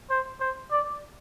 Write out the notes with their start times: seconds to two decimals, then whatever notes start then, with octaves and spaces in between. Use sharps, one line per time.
0.10 C5
0.41 C5
0.71 D5